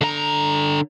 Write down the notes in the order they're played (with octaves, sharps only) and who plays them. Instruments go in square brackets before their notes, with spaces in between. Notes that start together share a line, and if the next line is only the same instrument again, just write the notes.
[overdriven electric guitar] D3 A#5